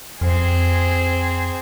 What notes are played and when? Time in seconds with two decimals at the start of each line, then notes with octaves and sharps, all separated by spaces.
0.21 F2 C4 G#4